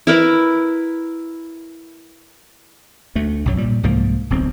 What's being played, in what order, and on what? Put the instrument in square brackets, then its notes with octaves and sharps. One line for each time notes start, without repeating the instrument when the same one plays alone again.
[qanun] E4 A#4 B4
[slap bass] D2 A3
B1 F#2 F#3
A#2 G3
C2 G#2 F3 A#3
D1 B1 C4